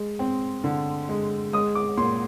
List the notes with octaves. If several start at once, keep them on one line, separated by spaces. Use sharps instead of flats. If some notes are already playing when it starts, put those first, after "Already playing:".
Already playing: G#3
C4
D3
G#3
G#3 D#6
D6
A#2 C6